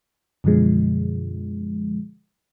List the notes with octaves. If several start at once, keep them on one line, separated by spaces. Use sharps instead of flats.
F#2 B2 D3 F3 G#3